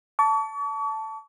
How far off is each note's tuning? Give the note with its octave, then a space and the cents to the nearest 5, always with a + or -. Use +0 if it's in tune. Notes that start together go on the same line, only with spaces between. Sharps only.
A5 +0 C#6 +45